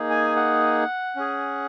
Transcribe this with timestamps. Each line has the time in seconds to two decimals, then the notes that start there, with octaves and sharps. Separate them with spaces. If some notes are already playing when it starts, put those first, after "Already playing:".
Already playing: A#3 D#4 G#4
0.10 G#5
0.36 F#5
1.16 C#4 G#4